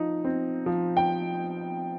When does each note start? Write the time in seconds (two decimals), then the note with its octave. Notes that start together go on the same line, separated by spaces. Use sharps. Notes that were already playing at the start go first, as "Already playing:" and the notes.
Already playing: F3 D#4
0.24 C4
0.66 F3
0.97 G5